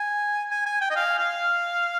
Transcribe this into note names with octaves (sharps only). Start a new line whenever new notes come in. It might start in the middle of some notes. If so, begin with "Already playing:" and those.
Already playing: G#5
G#5
G#5
G5
D#5
F5
F5